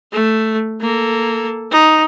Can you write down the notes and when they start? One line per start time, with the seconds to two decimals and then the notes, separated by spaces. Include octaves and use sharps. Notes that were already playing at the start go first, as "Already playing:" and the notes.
0.13 A3
0.81 A#3 A4
1.71 D#4